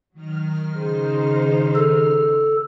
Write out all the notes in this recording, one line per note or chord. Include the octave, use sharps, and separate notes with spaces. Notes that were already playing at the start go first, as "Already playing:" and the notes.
D#3 F#3 F6
C#3 D#4 G#4 C5
A4